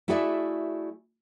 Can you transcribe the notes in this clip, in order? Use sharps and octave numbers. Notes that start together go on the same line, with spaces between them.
A3 E4 F#4 G#4 D5 E5